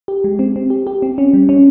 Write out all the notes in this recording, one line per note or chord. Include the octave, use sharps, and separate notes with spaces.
G4
G#3
C4
C4
G4
G4
C4
C#4
G3
C#4